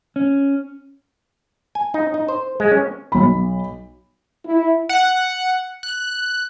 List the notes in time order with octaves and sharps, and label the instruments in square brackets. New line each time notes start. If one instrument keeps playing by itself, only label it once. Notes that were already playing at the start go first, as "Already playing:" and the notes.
[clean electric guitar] C#4
[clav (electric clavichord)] G#5
D#4
D#4
C5
G#3
C#4
[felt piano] B1 B5
[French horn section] E4
[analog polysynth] F#5
F#6